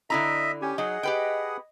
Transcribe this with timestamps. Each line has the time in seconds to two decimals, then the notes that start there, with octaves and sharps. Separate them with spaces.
0.10 D3 E4 D#5 E5 A#5
0.62 C#4 G4 G#5
0.78 F#3 D#4 G#4 D#5 F#5
1.03 G4 B4 G5